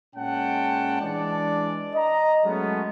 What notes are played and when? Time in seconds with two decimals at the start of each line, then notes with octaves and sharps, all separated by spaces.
0.15 A#2 G#3 C#4 F#5 G5 A5
1.01 E3 G#3 D4 D5
1.94 D#5 A#5
2.45 F#3 G#3 A3 B3 C#4